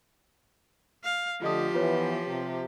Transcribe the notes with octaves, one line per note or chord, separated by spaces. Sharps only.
F5
D3 F3 A3 F4 G4 D#5 D#6
E3 B3 F4 B4 C#5
C3